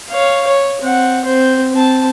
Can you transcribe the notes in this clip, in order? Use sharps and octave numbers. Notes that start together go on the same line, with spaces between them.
C#5 F5
C#5
C4 F#5
C4 C5
C4 A5